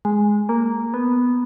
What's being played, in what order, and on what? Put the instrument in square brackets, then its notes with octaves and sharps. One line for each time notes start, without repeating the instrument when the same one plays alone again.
[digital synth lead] G#3
A#3
B3